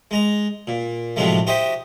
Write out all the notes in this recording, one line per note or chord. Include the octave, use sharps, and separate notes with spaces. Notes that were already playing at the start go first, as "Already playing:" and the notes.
G#3 A#5
A#2
A2 C3 F3 F#3 G#3 A3
E4 F#4 G4 C5 D#5